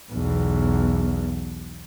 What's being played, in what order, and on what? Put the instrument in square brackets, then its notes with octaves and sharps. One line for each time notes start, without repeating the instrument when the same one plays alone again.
[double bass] B1 E2